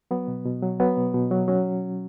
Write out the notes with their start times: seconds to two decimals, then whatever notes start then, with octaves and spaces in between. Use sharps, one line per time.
0.11 F#3 B3
0.28 B2
0.45 B2
0.62 F#3
0.80 F#3 B3
0.97 B2
1.14 B2
1.31 F#3
1.48 F#3 C#4